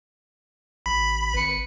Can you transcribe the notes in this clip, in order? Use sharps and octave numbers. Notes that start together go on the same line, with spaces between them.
A1 B5
G#1 B4 C#7